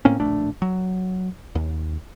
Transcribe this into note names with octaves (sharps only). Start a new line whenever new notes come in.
A2 A#3 C4 C#4
D1 A#1 A3 D4
F#3
D#2